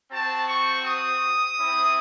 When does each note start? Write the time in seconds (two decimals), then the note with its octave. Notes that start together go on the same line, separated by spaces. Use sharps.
0.11 C4 F#4 A5
0.47 C#6
0.85 D#6
1.58 C4 E4